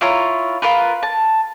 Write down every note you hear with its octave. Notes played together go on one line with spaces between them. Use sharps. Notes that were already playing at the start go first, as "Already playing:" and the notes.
E4 F4 C#5 A#5
F4 A#4 B4
A5